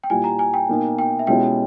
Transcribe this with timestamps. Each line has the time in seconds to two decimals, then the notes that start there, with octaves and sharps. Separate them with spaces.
0.04 G5
0.10 A#2 G3 A#3 E4 G4 G#5
0.24 A#5
0.39 G#5
0.54 G5
0.69 B2 A#3 D#4
0.99 G5
1.19 E5
1.27 B2 G#3 C#4 E4 G4 G5